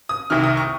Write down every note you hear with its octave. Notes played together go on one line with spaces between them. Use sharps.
D#6
C2 C3 D#3 F6
D#6
C#6